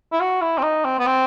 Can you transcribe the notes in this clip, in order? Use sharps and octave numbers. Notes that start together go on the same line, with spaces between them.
E4
F#4
E4
C4
D#4
C4
B3
C4